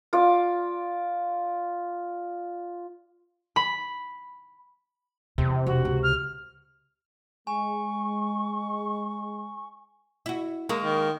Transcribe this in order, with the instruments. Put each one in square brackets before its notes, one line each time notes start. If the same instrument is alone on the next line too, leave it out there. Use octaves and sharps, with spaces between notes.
[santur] F4 D5
[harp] B5
[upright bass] E2 [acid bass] C3
[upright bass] E1 [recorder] F#4
[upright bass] C#2
[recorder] F6
[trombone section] G#3 [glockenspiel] G#5 [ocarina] C#6
[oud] E4 F#4
[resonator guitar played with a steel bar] G#3 A#3 [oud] A#4 [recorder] C#6
[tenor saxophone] D#3